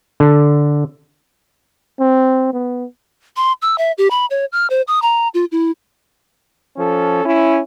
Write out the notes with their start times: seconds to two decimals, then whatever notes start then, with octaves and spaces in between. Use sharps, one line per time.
0.20 D3
2.00 C4
2.53 B3
3.36 C6
3.62 E6
3.78 E5
3.98 G4
4.11 B5
4.30 C#5
4.52 F6
4.70 C5
4.88 D#6
5.02 A#5
5.34 F4
5.52 E4
6.77 F3 C#4 A4
7.25 C#4 E4